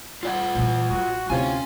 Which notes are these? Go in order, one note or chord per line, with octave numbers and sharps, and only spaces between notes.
F4 D5 F#5
A#2 E3
A1 F#3 F#4
D2 C3 C#4 E4 F4 G5 G#5